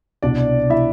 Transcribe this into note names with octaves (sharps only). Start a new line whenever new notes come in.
C2 B2 D4 D5
E4 E5